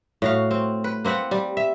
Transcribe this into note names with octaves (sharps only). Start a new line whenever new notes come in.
A2 F#4 F5
C4
B4
A#3 C4 B4 F#5
G3
E5